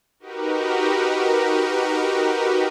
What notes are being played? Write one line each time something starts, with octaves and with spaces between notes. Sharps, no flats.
D#4 F#4 G4 A#4 B4